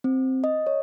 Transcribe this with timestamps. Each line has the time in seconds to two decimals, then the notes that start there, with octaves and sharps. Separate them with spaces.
0.04 C4
0.44 D#5
0.67 C#5